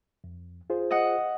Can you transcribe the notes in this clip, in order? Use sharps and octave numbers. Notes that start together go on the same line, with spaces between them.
F2
F4 G#4 C5
D#5 F#5